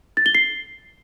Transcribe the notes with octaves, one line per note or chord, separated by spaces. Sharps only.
A6
G7
C7